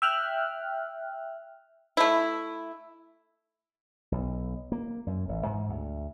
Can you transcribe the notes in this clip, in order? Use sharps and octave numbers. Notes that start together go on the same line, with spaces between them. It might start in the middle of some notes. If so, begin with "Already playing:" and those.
E5 G5 F6 F#6
A3 E4
B1
A#3
F#2
A1
G#2
D2